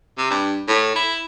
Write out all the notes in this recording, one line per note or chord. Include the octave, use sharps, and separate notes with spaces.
C3
G2
A2
E4